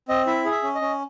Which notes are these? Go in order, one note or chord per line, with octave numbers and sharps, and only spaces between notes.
C4 D#5
E4 E5
G#4
E5
C#4
D#5
C#4